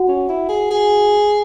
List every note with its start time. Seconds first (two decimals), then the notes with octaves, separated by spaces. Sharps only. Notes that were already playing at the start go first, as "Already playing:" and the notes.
Already playing: F#4 F#5
0.08 C#4
0.29 E4
0.49 G#4
0.71 G#4